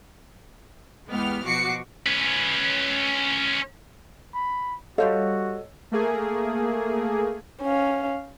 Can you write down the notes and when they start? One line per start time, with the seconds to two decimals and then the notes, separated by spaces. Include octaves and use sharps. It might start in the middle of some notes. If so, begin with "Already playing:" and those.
1.08 E2 G#3 B3 G4 F6
1.44 B2 F3 F#4 D6 C7 C#7
2.06 C#4 B4
4.34 B5
4.98 G3 F#4 A4 C5 C#5 D#5 F5
5.91 A3 A#3 G#4
7.62 C#4 F5